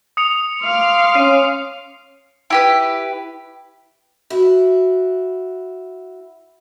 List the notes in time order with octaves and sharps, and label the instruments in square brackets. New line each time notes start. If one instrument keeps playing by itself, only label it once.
[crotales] D#6 C#7 F7
[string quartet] F5 C6 D6
[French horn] C#4 [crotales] C7 D#7
[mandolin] E4 G4 B4
[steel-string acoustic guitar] E4 F#4